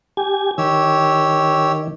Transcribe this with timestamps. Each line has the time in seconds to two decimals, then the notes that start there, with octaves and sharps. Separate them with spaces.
0.17 G4 G#5
0.58 D#3 G4 C#5 E6